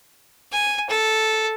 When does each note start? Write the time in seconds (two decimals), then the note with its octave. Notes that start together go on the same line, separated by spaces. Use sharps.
0.52 G#5
0.90 A4